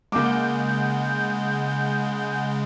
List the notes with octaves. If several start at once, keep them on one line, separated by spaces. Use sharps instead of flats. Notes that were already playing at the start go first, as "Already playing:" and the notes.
C#3 G#3 A#3 F#5 G#5 D6 G6